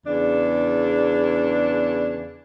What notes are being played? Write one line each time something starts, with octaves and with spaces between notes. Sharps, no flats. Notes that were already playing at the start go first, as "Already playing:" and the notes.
E2 C#3 D4